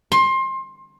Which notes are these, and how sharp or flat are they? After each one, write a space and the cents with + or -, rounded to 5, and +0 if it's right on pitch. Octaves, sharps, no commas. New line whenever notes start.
C6 +25